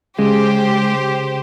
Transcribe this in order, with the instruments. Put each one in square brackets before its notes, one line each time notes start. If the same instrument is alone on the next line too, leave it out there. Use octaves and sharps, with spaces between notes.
[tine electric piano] C#3 [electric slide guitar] G#3 [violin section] G4 C5